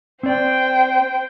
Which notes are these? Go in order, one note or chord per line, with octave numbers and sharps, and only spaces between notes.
C4 C5 D5 G5